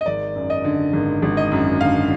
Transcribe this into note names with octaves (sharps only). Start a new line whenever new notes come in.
D#5
G#1 D5
F#2
D#5
D3
G#1
G#1
D#5
F#2
D3 F5